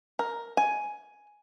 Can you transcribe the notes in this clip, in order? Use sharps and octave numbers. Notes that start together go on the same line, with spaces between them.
A#4
G#5